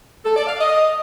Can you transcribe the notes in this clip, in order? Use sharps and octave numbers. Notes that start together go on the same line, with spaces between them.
A4
D5
F5
D#5